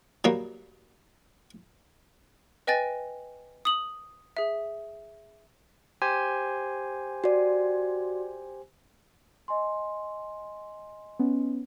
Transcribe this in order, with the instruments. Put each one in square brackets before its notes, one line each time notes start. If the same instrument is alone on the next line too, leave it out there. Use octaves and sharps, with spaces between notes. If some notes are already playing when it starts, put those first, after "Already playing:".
[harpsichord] F#3 G3 A#3 C#5
[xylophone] B4 D#5 G5 G#5 A6
D#6 F#7
G#4 E5
[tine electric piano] G4 C5 G#5
[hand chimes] F#4 D5
[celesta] D#5 G#5 C6
[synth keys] B3 C#4